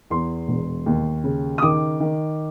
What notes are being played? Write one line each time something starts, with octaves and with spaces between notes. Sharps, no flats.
E2 C6
E1
D#2
C#3
D#6
D#3 D6
D#3